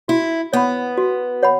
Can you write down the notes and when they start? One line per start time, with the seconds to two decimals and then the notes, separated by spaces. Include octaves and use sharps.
0.08 E4 F#4
0.53 B3 C#5 F#5 B5
0.98 F#4
1.43 C#5 F#5 B5